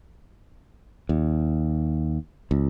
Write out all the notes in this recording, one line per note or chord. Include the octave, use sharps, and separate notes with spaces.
D#2
C#2